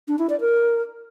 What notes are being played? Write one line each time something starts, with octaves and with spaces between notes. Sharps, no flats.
D4
E4
D5
A#4